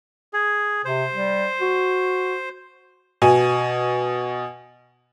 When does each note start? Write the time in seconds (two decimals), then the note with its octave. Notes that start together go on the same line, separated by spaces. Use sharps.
0.33 G#4
0.85 C3 C5
1.14 G3
1.61 F#4
3.22 B2 G#5